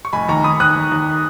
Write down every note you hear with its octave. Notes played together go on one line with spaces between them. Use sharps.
C#6
F1 G#5 B5
D#2 A#5 C#6
D#2 B5 D#6
D#2 D#6 F#6
D#2
D#2